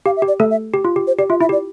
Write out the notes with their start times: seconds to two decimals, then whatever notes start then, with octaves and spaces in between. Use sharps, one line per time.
0.06 G4 F5
0.17 E5
0.22 G4
0.28 D5
0.40 A3 A4 E5
0.50 E5
0.74 G4
0.85 F4
0.96 G4
1.07 C5
1.19 G4 D5
1.30 F4 E5
1.41 E4 E5
1.49 G4
1.52 D5